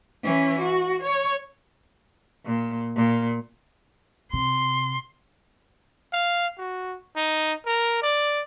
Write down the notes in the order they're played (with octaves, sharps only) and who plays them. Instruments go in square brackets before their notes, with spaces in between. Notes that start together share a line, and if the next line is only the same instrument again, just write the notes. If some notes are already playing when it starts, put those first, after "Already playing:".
[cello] E3 C#4
F#4
C#5
[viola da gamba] A#2
A#2
[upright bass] C3 [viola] C6
[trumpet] F5
F#4
D#4
A#4
D5